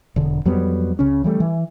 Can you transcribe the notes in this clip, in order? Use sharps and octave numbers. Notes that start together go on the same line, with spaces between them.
E1 D3
F2 F#3 G3 B3
C#2 C#3 C#4
E3 G3 A3
E3